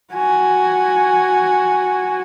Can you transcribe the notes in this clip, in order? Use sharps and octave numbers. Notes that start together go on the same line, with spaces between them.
F#4 G#5